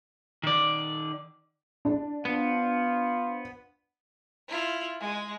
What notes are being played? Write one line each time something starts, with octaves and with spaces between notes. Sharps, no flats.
D#3 D5
D4
B3 F4 C5 F5
E4 F4
G#3